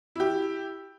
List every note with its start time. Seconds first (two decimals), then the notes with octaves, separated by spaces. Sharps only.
0.16 E4 G4